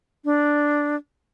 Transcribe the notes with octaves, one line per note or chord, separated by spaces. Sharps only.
D4